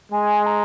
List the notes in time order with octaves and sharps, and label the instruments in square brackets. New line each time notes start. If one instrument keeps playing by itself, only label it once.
[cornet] G#3 [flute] G#5
[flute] A#5